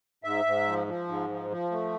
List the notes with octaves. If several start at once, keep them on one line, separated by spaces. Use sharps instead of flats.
G#2 E5
G#2
F3
F3
G#2
F3
F3
A3